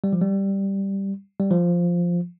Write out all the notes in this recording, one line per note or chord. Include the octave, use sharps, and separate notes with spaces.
G3
F3
G3
G3
F3